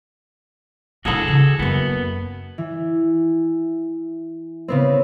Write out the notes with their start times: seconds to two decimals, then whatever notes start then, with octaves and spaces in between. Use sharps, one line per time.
1.05 E3 D4 F#4 G#4 A4
1.28 C#3
1.59 F#2 A#3 B3
2.58 E3
4.68 C#3 B3 C4